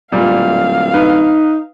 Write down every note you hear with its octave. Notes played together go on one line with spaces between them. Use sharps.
D1 A#2 G3 F5
D#4 B4